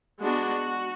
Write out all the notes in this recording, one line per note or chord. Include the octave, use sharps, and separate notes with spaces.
G#3 B3 D4 F#4